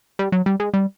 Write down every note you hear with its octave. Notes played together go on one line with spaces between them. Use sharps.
G3
F#3
G3
G#3
G3